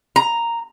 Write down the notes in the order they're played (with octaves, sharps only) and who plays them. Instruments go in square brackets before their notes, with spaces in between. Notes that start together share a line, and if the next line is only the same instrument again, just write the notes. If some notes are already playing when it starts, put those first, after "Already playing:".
[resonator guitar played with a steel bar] A#5